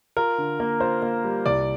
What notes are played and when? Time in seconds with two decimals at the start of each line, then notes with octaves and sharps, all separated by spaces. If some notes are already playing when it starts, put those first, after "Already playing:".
0.17 F4 A#4
0.38 D3
0.60 A#3
0.80 F4 C5
1.02 A#3
1.24 G3
1.46 C2 D5